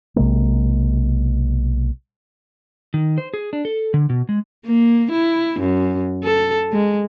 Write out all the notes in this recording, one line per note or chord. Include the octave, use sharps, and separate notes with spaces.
B1 C3 G#3 A#3
D#3
C5
G#4
D4
A4
D3
B2
G#3
A#3
E4
F#2
A4
G#3